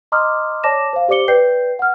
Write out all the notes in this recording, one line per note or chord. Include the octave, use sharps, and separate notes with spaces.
D#5 A#5 C6 D6 D#6 F6
C#5 D5 A5 D6 A#6 E7
C5 F5
G4 C5 D5 D6 C#7 G7
B4 D5 G5 G6 C7
F#5 F6